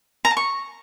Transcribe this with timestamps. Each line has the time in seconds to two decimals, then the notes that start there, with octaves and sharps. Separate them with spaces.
0.25 A#5
0.31 A5
0.37 C#6